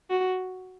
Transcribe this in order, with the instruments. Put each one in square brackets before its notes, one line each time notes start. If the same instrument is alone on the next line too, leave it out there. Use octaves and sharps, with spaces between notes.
[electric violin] F#4